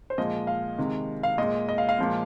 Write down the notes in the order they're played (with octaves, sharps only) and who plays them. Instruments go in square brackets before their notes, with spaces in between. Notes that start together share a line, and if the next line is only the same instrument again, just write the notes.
[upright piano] C5
A#2 F3 G#3 D#5
F5
C3 D#3 G#3
F5
A#2 G#3 D#5
D#5
F5
F5
A#2 F3 G#3